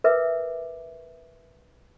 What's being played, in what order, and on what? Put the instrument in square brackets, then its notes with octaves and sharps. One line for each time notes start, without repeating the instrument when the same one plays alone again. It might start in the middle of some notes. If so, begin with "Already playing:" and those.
[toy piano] A#4 B4 E5 D6